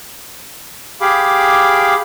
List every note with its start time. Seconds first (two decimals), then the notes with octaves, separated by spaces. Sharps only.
1.01 G4 G#4 F5 B5 D6